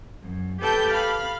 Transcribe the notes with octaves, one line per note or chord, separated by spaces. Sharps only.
F#2
G4 A4 B4 G5 A5 G6
F5 B5 F6